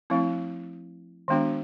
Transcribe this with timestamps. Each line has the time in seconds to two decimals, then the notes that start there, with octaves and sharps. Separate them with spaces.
0.10 F3 A3 C4 E4
1.28 D#3 G#3 B3 D4 F#4